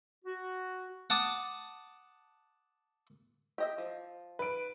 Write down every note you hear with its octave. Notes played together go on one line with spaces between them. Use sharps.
F#4
F#5 A5 D6 D#6
G4 D#5 E5
F3
B4 D7